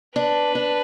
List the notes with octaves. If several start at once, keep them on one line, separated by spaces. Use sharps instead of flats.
D4 B4
D4